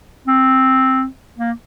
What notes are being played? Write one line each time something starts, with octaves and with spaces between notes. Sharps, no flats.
C4
A#3